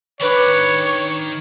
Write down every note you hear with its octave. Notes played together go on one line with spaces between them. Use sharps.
D#3 D4 B4 C#5 D5 B5